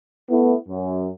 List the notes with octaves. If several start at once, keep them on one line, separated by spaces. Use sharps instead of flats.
A3 B3 E4
F#2